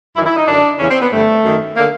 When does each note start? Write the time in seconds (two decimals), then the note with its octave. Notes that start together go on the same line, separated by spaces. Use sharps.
0.16 F#2 E4
0.20 D#3
0.26 E4
0.37 D#4
0.47 F#2 D3 D4
0.79 E2 C#3 E3 C#4
0.90 C4
1.01 B3
1.11 G2 D3 A3
1.43 F#2 D#3
1.75 D3 A#3